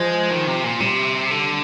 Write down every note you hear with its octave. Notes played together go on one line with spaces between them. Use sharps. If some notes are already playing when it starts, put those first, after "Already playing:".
Already playing: F3 G#3
D#3
C3
A#2
C3 G3
D3